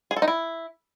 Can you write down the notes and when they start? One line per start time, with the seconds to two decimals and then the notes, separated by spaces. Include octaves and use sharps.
0.11 G#4
0.16 A4
0.22 D#4
0.28 E4